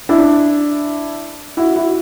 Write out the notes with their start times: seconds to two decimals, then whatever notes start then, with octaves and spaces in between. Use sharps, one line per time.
0.09 D4 E4
1.57 E4 F#4
1.75 E4 F#4